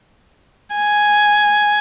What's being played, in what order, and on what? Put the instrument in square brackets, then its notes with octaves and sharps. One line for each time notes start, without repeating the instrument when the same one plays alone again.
[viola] G#5